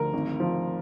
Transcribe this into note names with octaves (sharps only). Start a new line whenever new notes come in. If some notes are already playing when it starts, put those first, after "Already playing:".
Already playing: D2 F3 A#4
G#1
F3